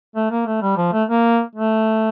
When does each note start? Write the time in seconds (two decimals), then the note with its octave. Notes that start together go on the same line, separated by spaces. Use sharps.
0.16 A3
0.31 A#3
0.46 A3
0.62 G3
0.77 F3
0.93 A3
1.09 A#3
1.56 A3